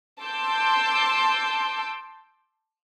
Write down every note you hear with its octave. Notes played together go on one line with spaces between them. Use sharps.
A5 C6 D6 E6 G6